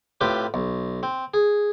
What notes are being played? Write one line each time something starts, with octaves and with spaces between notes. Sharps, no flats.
A2 C4 F4 G4 B4
B1
C4
G#4